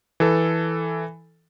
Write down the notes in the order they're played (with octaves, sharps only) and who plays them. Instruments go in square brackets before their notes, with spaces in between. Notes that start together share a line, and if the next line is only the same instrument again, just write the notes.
[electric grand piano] E3 A4